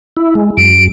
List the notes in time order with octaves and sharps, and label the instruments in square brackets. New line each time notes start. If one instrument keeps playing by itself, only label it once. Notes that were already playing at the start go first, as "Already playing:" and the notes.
[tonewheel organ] E4
G#3
[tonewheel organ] F#2 [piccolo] D7